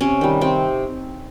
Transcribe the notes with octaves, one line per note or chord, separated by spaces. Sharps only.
C3 C#4
D#3 G3 D#4
C3 C4